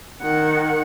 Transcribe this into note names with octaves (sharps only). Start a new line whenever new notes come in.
D#3 F#5